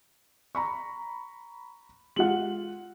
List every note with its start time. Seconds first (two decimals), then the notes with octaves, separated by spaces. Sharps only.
0.55 A#5 B5 C#6
2.16 G#3 F4 F#5 F#7